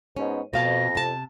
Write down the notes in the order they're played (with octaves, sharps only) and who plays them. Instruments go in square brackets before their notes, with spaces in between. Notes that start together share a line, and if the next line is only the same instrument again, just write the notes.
[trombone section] G#2 B2 [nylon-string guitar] C#4
[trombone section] F2 [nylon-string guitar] B2 F5 A5 [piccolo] A#6
[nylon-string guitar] C3 A5